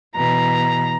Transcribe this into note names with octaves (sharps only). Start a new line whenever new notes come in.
B2 E3 A#5